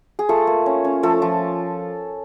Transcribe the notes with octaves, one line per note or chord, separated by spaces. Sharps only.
G#4
A3 F4 A4
A#3
C#4
C#4
F3 A3 A4
F3